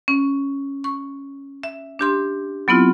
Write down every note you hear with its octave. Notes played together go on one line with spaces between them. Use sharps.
C#4
C#6
E5
D4 G4 C6
F#3 B3 C4 E4 F4